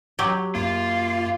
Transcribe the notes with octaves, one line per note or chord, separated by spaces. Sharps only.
F#3 G4
F#2 A#3 F4